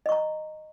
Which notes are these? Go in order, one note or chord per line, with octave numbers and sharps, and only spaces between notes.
D#5 A#5 C#6